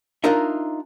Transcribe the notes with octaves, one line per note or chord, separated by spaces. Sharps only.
D4 D#4 F4 A#4 D#5 E5